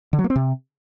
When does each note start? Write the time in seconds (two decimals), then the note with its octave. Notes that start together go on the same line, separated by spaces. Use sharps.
0.13 D3
0.19 F#3
0.24 A#3
0.30 C4
0.36 C3